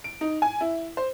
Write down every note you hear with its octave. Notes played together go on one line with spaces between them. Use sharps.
D7
D#4
G#5
E4
C5